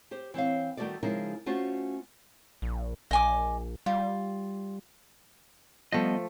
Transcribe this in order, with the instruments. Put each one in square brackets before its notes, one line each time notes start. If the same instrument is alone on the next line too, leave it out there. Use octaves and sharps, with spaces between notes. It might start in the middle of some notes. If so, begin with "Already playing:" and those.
[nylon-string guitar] G4 C5
E3 C4 C#5 F5
D#3 G3 A3 B3 F#4 D5
C#3 F3 G#3 D#4 E4 A#4
A3 C#4 F4 F#4 C5
[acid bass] A#1
[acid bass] A#1 [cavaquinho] D#5 G#5 D6
[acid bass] G3 [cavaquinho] F4
[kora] F3 A3 [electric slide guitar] G3 B3 D#5